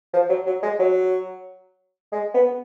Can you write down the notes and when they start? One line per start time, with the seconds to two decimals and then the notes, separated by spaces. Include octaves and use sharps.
0.13 F3
0.29 F#3
0.46 F#3
0.62 G#3
0.79 F#3
2.12 G#3
2.34 B3